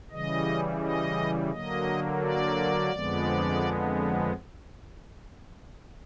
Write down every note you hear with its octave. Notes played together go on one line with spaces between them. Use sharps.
C#3 E3 G3 D#5
D#5
D3 F#3 A#3 D#5
D5
F2 D3 F3 G#3 B3